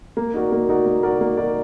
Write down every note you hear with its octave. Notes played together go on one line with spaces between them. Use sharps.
A#3
D#4 F#4 A#4 D5
A#3
D#4 F#4 A#4 D5
A#3
D#4 F#4 A#4 D5
A#3
D#4 F#4 A#4 D5